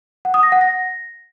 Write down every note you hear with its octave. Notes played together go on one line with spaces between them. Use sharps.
F#5
D#6
A#6
F#5
A#6